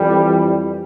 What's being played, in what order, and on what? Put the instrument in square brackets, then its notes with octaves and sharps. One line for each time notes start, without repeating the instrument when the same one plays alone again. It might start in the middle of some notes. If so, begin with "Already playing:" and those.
Already playing: [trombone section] F2 E3 G3